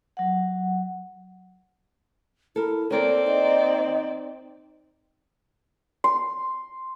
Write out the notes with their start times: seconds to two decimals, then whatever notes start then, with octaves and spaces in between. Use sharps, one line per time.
0.17 F#3 F#5
2.56 E4 A4 A#4
2.91 D#2 C4 A4 A#4 C#5 D5
3.27 D#4 D#5
6.04 C6